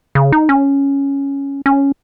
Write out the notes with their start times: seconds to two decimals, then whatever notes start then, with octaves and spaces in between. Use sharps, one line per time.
0.15 C#3
0.32 D#4
0.49 C#4
1.66 C#4